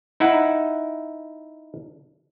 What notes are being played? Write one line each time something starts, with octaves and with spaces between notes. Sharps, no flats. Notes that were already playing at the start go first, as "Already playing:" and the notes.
D#4 E4 E5 F#5